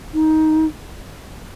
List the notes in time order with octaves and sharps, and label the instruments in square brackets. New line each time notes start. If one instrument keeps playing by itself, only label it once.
[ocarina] D#4